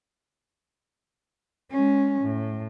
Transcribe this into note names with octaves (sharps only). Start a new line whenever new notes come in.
G#3 C#4
A2